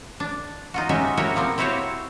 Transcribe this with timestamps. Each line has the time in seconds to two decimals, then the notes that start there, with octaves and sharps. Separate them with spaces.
0.20 D4
0.74 D#4 F4 F#4
0.89 G#3 C#4 D#4 F#4 G4 E5
1.17 E4 F#4 G4 A#4 C#5
1.36 F3 A#3 C4 A#4
1.58 C4 E4 F#4 G4 C5 C#5